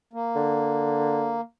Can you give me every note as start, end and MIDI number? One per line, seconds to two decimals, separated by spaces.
0.13 1.41 58
0.36 1.37 50